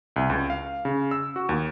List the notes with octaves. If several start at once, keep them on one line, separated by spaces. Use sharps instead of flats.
C2
C#2
F5
C#3
E6
F#4
D#2